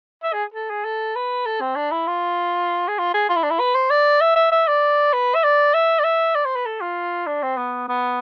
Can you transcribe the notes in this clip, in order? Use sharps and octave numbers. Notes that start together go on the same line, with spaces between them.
E5
G#4
A4
G#4
A4
B4
A4
C4
D4
E4
F4
G#4
F4
G#4
F4
E4
D4
E4
B4
C5
D5
E5
E5
E5
D5
B4
E5
D5
E5
D5
E5
D5
C5
B4
A4
F4
D4
C4
B3
B3